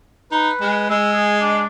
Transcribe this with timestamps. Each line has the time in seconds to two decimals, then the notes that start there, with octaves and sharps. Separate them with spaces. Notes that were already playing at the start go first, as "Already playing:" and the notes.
0.31 D#4 B4
0.61 G#3
0.90 G#3 E6
1.13 G#4
1.40 D4